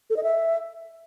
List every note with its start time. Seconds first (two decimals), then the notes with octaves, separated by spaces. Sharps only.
0.10 A4
0.17 D#5
0.23 E5